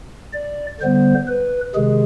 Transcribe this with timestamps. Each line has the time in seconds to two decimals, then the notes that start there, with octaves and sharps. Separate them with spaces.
0.33 D5
0.80 D3 G3 B3 C5
1.28 B4
1.75 C3 D#3 G#3 G#4